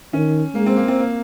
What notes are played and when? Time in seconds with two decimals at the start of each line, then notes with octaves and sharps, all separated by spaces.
0.13 D#3 C#4
0.54 G#3 A#3
0.66 C4
0.76 A#3
0.88 C4
0.99 A#3